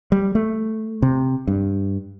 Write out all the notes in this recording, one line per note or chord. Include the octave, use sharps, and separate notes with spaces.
G3
A3
C3
G2